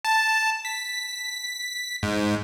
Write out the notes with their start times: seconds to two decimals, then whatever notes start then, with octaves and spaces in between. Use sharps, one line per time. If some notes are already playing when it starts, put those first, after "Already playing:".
0.05 A5
0.65 B6
2.03 G#2